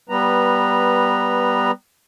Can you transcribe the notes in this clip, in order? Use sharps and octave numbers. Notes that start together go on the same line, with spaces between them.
G3 B3 B4 A#5